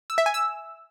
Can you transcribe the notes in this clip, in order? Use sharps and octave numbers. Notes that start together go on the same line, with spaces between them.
E6
E5
G#5
E6